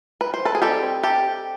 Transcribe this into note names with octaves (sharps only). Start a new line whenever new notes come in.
B4
C5
A4 B4
G#4
G3 C4 D#4 G4 A4
G4 A4